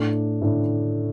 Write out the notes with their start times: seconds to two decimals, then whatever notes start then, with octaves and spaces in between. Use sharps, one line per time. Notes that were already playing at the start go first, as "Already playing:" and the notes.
Already playing: A2 A3 D4
0.42 A2 A3 D4